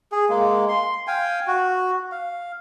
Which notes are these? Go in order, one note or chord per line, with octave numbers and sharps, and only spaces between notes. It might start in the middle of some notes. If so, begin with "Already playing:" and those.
G#4
G#3 A#3
C6
F5 G5 G#5
F#4
F5